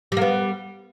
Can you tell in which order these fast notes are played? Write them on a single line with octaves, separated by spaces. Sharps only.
G3 A#3 B3